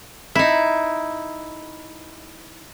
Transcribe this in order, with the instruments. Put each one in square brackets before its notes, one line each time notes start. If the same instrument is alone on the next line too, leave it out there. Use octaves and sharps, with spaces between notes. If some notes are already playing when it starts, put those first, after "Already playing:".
[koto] D#4 E4